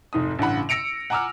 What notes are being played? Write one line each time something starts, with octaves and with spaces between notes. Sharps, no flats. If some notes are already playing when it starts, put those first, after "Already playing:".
F1 G#2 D#6
A1 G2 C#3 F#5 B5
E6 A#6 C#7 D7 F7
F#5 G#5 A#5 D6 E6 F6